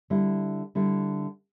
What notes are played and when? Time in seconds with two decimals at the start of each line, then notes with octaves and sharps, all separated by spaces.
0.10 D3 G3 E4
0.75 D3 G3 E4